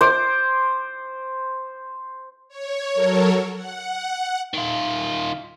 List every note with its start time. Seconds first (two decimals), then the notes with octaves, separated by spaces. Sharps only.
0.01 C5 D6
2.48 C#5
2.91 F#3 A4 A#4 C#5
3.53 F#5
4.54 D#3 F4